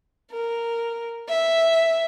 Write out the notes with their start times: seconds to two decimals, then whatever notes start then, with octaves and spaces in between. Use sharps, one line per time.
0.32 A#4
1.29 E5